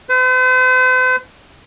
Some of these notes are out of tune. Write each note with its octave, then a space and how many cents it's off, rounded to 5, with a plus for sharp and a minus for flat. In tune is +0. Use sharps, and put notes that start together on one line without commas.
C5 -45